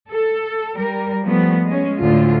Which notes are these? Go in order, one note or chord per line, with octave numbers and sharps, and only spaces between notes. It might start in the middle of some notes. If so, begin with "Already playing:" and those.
A4
G3 A#4
F3 G3 A3 B3
G#3 C#4
D2 A2 D3 F4